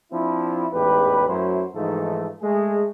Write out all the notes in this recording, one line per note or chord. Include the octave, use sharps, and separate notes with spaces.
F3 C4 D4 E4
A1 E2 G#2 G4 B4
F#2 F#3 A3 C#4 E4 C5
G#2 E3 F3 A3 D#4 A4
G#3 A3 G#4